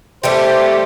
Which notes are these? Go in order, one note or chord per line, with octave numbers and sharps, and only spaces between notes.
E3 G3 A3 G4 C5